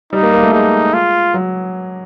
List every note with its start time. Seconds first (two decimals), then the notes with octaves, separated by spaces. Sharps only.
0.13 G3 D#4
0.23 A#3
0.33 A#3
0.43 A3
0.53 G#3 D#4
0.94 F4
1.34 F#3